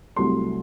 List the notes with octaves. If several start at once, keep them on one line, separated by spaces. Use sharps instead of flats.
C2 C3 F#3 A3 C6